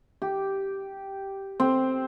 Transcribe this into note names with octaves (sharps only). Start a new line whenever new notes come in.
G4
C4